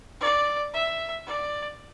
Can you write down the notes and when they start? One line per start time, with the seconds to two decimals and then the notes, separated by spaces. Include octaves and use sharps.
0.21 D5
0.74 E5
1.27 D5